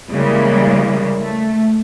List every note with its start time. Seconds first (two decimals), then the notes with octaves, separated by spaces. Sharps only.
0.11 C#3 E3 G3 G#3 A#3
1.22 A3